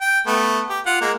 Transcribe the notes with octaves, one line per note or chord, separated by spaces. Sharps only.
G5
A3 B3
G4
F4 F#5
G#3 A#3